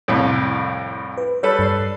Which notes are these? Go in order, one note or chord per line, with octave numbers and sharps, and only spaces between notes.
C2 F2 A2
B4
G3 A4 B4 C#5
G2 D5 C7